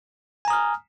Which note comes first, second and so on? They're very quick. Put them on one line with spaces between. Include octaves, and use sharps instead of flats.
G#5 A#5 D#6 F6